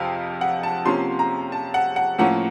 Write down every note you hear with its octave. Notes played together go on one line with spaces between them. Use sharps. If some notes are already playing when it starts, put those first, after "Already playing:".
Already playing: F2 C3 C4 F5
F#5
A5
C3 F3 A#3 C#4 C6
A#5
A5
F#5
F#5
A2 F3 A#3 C#4 F#5